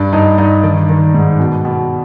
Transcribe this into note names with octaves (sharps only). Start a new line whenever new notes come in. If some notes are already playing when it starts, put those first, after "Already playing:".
Already playing: G2 D4 D5
G2 D#4 D#5
G2 D#4 D#5
D#3 D4 D5
D#3
G#2
B2
B2